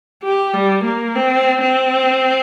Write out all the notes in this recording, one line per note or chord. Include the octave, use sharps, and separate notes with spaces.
G4
G3
A#3
C4
C4